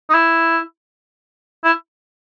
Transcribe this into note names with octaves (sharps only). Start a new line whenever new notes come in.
D#4
E4
E4